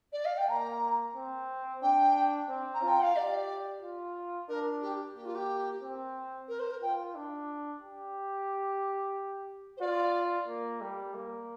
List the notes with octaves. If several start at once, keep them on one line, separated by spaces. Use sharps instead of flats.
D5
F5
G5
A#3 A#5
C4
D4 G5
C4
A#5
F4
G5
F5
G4 D5
F4
D4 A#4
G4
A#3 G4
F4
G4
C4
A#4
C5
A#4
F4 G5
D4
G4
C5
F4 D5
A#3
G3
A#3